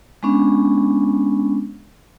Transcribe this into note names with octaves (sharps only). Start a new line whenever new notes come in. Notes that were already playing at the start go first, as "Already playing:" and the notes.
G#3 B3 C#4 D4